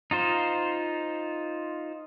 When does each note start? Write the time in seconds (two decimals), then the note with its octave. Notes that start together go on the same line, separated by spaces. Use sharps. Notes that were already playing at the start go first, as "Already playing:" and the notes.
0.11 D#4 F4 C5